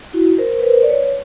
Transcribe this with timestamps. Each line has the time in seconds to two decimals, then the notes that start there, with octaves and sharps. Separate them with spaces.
0.13 E4 F#4
0.38 A#4 C5
0.59 B4
0.63 A#4 C5
0.83 D5
0.89 B4 C#5